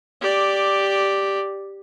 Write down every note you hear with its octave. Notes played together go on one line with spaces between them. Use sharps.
G4 D5